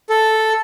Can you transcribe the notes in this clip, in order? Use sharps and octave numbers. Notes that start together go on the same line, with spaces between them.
A4